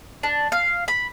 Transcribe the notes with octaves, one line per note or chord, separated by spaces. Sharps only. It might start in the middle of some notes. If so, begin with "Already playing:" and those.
D4
F5
B5